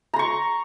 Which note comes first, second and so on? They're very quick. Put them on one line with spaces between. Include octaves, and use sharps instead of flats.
A#5 C6 C#6